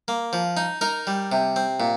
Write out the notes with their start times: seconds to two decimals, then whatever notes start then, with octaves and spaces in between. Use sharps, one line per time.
0.08 A#3
0.33 F3
0.57 D#4
0.81 D#4 A#4
1.07 G3
1.32 C3
1.56 C4
1.80 A#2